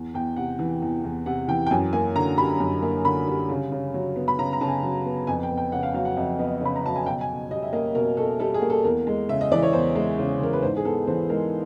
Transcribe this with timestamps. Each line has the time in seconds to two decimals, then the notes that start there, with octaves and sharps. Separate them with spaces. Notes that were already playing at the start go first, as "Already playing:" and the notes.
Already playing: E2
0.14 E2 G5
0.37 C3 F#5
0.59 E3
0.82 E2
1.04 E2
1.26 C3 F#5
1.48 E3 G5
1.67 G5
1.71 F#2 G#5
1.93 A#3 G#5
2.16 D3 A#5
2.38 G3 B5
2.60 F#2
2.82 A#3
3.05 D3 B5
3.27 G3
3.50 C#3
3.72 C#3
3.94 F#3
4.16 B3
4.28 B5
4.39 C#3 A#5
4.53 A#5
4.61 C#3 A5
4.68 G#5
4.83 F#3
5.06 B3
5.27 F2 G#5
5.43 G5
5.51 B3
5.58 G5
5.72 C#3 F#5
5.83 F5
5.94 F#3 F5
6.05 F#5
6.17 F2 E5
6.39 B3 D#5
6.61 C#3 B5
6.76 A#5
6.84 F#3 A5
6.96 G#5
7.06 B2 G5
7.21 G#5
7.29 B2
7.51 G3 D#5
7.63 E5
7.73 A#3 D#5
7.95 B2 A#4
8.17 B2 A4
8.40 G3 A4
8.54 G#4
8.62 A#3
8.70 A4
8.84 E2 A#4
9.07 G#3
9.29 C#3 E5
9.41 D#5
9.51 E3 D5
9.63 C#5
9.73 E2 C5
9.96 G#3
10.19 C#3
10.40 E3 A#4
10.53 B4
10.62 G#2 C5
10.77 G#4
10.85 B3 A4
11.07 E3 C5
11.29 G#3 A#4